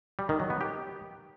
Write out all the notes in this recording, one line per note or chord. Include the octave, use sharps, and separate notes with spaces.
G3
D#3
F#3
B3
G4